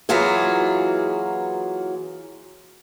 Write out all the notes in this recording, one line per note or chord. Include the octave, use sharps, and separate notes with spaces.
E3 F#3 A#3 F4 F#4 G#4